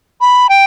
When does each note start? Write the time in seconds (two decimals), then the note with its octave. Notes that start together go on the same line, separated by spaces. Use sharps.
0.21 B5
0.49 G5